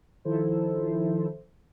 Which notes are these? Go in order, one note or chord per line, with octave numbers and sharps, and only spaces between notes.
D#3 F3 E4 A4 C5